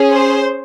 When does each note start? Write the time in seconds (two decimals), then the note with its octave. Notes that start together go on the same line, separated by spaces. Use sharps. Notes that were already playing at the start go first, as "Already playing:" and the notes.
Already playing: C#4 G#4
0.11 C5